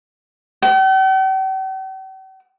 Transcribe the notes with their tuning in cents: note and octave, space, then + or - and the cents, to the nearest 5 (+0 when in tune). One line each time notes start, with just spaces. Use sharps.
G5 -45